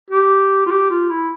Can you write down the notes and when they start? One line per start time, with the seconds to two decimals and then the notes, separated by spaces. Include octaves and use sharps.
0.11 G4
0.66 F4
0.71 G4
0.90 F4
1.11 E4